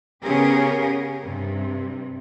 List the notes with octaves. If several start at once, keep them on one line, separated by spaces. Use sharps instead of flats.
C#3 B3 C#4 G4 G#4 A#4
G2 C3